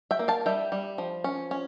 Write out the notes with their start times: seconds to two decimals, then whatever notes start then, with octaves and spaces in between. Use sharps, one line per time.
0.11 E5 G5
0.19 A#3
0.28 F5 A5
0.46 G3 E5 G5
0.72 G3
0.98 F3
1.24 C#4
1.51 C#4